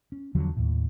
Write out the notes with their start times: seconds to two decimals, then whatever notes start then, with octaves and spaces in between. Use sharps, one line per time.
0.12 C#4
0.35 E2 D3 F3 F#3
0.57 D#2 A2